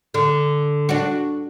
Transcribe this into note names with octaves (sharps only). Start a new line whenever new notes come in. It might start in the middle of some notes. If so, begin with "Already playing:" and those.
D3
D4 F#4